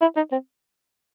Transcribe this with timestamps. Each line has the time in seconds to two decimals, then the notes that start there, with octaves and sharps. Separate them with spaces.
0.01 E4
0.16 D#4
0.32 C4